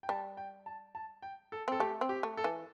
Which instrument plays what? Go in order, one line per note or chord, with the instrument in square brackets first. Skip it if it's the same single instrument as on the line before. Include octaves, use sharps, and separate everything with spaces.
[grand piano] G5
[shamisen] G3 [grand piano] A5
[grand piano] G5
A5
A5
G5
A4
[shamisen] C4 [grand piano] A4
[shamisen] A3 [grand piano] G4
[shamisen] C4
[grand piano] G4
[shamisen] A3
[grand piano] A4
[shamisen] E3